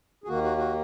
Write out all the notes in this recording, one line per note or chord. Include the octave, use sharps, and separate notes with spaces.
G#4
D#2 D#3 A#3 F#4
F#4
F#4